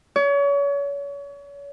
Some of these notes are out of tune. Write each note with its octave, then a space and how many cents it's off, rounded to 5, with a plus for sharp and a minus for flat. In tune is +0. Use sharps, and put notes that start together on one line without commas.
C#5 +35